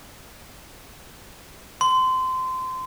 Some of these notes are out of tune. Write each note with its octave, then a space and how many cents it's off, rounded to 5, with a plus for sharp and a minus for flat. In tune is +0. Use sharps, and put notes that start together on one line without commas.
C6 -25